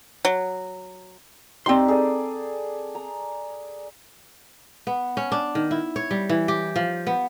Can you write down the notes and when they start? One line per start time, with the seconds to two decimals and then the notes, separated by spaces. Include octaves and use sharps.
0.25 F#3
1.66 C4 D#4 G4 D5 C6
1.88 G#4 A4 D5
2.95 A#5
4.87 B3
5.17 C#4
5.32 D4
5.55 D#3
5.71 E4
5.96 C#5
6.11 G3
6.29 E3
6.48 G4
6.76 F3
7.07 B3